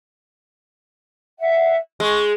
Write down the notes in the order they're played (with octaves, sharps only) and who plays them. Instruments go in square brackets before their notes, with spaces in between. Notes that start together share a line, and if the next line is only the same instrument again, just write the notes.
[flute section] E5 F#5
[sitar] G#3 [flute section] C#6